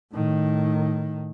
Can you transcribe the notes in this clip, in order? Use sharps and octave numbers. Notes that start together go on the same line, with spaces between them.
A2 D#3